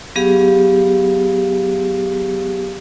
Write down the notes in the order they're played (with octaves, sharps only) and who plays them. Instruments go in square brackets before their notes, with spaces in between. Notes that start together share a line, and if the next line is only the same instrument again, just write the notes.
[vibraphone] F#3 B3 G4 G#4 F5